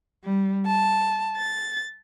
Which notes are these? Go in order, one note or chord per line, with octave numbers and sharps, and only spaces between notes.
G3
A5
A6